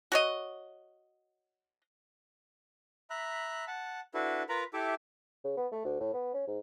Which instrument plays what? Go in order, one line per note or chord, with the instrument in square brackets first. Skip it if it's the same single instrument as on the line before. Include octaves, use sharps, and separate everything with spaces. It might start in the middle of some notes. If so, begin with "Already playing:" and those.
[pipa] F#4 C#5 D#5
[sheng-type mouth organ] E5 A#5 B5 F#6
F#5 A5
D4 E4 F#4 A4 B4
F4 A#4 B4 A#5 B5
E4 G4 A4 E5 D6
[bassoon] C#3
B3
A3
D2
A2
B3
C#4
G#2